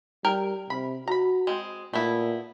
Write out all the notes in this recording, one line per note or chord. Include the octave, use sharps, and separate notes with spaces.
G3 A#4 G5
C3 B5
F#4 A#5 B5
G#3 C4
A#2 A3 B3 E4